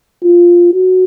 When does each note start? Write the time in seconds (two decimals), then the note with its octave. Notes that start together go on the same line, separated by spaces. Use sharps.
0.24 F4
0.74 F#4